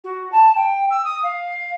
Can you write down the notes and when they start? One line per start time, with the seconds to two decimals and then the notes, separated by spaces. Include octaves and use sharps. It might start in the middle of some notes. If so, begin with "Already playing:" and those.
0.04 F#4
0.32 A5
0.56 G5
0.90 E6
1.04 D#6
1.23 F5